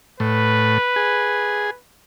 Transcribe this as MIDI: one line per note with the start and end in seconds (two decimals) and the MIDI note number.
0.20 0.78 45
0.20 1.78 71
0.96 1.70 68